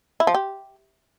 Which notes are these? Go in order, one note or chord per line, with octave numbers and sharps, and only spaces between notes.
E4
F3
G4